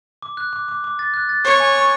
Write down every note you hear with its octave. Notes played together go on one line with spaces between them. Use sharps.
D6
F#6
D6
D6
D6
A6
F#6
A6
C#5 C#6
G#5
C#6